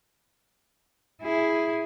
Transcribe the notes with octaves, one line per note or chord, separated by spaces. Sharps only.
E4 G#4